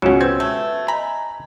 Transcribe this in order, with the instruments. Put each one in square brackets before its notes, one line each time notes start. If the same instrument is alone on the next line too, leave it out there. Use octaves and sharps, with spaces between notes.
[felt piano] C#2 B2 [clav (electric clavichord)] F#3 C#4 [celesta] C#7 D7 E7
[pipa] C4 [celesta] B4 E6 G6 [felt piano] G#6
[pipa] A3
[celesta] D#5 G#5 [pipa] A#5 B5